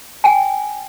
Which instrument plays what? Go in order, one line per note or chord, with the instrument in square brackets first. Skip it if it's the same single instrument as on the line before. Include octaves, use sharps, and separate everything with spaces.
[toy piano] G5 G#5